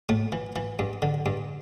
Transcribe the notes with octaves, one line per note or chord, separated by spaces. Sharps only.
A2 A3
E3
E3
G2
D3
G2